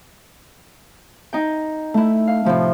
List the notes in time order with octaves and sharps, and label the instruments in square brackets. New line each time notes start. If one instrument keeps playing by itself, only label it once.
[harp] D#4 G5
A3 E4
F5
A2 C3 F3 A3